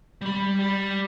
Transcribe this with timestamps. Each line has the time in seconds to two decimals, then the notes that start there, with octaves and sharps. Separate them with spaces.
0.22 G3 B5
0.59 G3